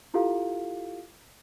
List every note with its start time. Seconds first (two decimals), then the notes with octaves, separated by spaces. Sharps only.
0.14 E4 F4 G4 A4 F5